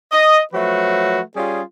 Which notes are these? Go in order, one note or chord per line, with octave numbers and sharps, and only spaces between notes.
D#5
F3 F#3 A3 F#4 B4
G3 C#4 F4 G#4